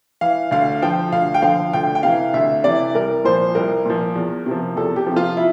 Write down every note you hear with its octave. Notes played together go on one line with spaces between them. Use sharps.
E3 F5
D2 F5
D3 F3 G5
D2 F5
G5
D3 F3 F5
D2 G5
G5
C3 E3 F5
D2 E5
C3 E3 D5
C2 A#4
A#2 F3 C5
C2 A#4
A#2 F3
E2
C3 F3
E2 A4
G4
C3 F3
F4
E4